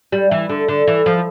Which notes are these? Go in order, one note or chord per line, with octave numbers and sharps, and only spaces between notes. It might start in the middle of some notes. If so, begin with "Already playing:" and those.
G3
E3
D3
D3
E3
F3